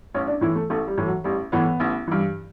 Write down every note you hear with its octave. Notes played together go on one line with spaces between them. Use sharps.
A1 C#4
D4
A2 E3 E4
A3
A1 A3
G3
A2 E3
F#3
A1 G3
A2 E3 B3
A1
G2 E3